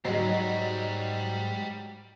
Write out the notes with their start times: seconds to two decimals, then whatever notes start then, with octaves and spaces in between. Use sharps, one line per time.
0.05 G#2 F#3 G3 F#4 D#5 C7